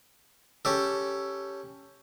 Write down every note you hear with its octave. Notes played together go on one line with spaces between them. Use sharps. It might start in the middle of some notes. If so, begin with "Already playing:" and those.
C#4 G4 A4